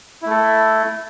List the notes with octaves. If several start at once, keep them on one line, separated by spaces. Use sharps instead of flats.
A3 E4 A4